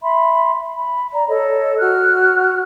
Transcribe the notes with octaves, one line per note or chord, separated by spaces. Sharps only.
E5 B5 C6
B5
D5 A#5
A4 C#5 D#5
F#4 F6 F#6